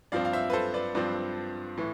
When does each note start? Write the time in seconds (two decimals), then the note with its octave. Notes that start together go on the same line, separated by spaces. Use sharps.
0.12 G2 F3 C4 D5 F5
0.25 F5
0.33 C5 E5
0.50 B4
0.53 A4 C5
0.74 B4 D5
0.95 G2 F3 C4 B4 D5
1.77 A2 E3